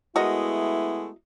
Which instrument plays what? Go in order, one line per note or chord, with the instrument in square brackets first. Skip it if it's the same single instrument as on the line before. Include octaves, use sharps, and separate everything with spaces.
[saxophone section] G#3 A3 B3 [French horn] E4 [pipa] F#4 A#4 D#5